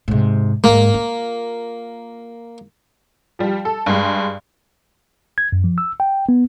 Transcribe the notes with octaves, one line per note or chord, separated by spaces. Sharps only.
G#2 C3
G#2 A#3
F4
F3 G3
A4
G2 G#3
G#6
F#2
F3
E6
G5
B3